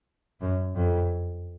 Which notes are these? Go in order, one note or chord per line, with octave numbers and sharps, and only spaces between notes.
F#2
F2